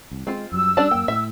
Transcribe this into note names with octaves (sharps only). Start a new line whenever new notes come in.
C2
G#3 C4 F4
F#2 F#3 G3 E6
G3 C#4 D4 D5 A5
F#2 A#3 G5
A2 E5